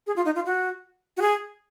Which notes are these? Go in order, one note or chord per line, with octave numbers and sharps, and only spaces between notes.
G#4
F4
D#4
F4
F#4
F#4
G#4